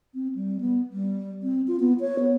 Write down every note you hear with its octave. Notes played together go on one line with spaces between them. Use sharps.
C4
G3
B3
G3
C4
F4
B3
C#5
B3